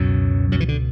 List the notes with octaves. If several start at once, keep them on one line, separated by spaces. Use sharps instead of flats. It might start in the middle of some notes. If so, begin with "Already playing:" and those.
Already playing: C#2 F#2 B2 F#3
F#2 F#3
E3
D3